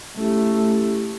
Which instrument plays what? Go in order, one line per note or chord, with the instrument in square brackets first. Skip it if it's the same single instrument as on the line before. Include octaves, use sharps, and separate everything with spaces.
[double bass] A3 [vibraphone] C#4 E4 G4